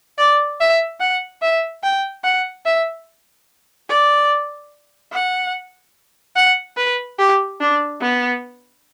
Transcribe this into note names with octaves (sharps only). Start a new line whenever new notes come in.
D5
E5
F#5
E5
G5
F#5
E5
D5
F#5
F#5
B4
G4
D4
B3